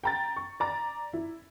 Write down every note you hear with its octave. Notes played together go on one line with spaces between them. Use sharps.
G5 A#5 A6
C#6
D5 A#5 A6
E4